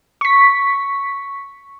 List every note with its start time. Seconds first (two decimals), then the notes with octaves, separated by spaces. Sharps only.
0.21 C#6 B6